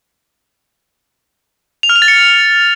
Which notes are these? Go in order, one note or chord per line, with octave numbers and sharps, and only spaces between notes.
F7
F6
F7
A6
C#7